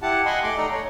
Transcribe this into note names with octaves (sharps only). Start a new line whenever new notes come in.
E4 G4 F#5 A5
D#5 F#5 G#5 B5 C6
A3 C6 D6
D#4 A4 D5 A#5
C#5